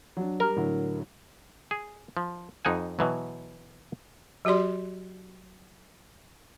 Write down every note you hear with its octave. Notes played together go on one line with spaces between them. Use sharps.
F#3 D4
G3 A#4
A2 D3 F#3
G#4
F3
F2 D#4 F#5 G#5
B2 E3 F#3
F#3 F#4 G4 D5 C6